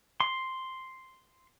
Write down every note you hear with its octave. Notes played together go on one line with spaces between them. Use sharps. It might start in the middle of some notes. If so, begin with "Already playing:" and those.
C6